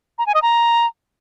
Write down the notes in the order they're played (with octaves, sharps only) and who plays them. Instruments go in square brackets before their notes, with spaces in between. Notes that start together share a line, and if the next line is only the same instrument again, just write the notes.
[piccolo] A#5
G#5
D#5
A#5